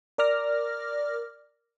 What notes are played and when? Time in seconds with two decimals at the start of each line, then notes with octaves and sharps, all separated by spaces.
0.18 A#4 D5 D6 F6 A#6